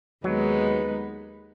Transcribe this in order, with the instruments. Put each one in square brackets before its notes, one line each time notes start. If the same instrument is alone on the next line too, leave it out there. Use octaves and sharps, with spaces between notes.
[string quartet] D#2 D#3 G#3 B3 D#4 [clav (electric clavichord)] F#3